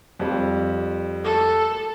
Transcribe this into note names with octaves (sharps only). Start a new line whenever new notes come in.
F2 G3
A4